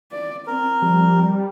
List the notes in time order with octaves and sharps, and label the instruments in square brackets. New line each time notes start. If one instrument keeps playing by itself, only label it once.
[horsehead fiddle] D5
[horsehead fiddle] C4 [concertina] A#4
[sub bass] F3 [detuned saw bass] G3